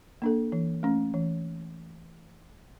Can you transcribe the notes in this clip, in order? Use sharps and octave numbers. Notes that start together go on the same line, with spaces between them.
A#3 D4 A4
E3
A3 C#4
E3